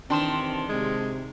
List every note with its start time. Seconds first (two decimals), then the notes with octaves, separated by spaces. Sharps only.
0.10 C3 D#3 E3 C4 D4 C6 E7
0.69 C3 G#3